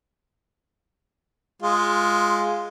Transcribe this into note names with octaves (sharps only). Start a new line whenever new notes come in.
G#3 F4